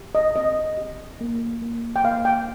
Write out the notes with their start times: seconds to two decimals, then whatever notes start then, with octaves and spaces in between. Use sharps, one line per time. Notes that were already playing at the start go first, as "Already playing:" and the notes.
Already playing: G4
0.15 D#5
0.36 C4 D#5
0.78 G4
1.21 A#3
1.62 A#3
1.96 G5
2.04 A#3 F5
2.25 G5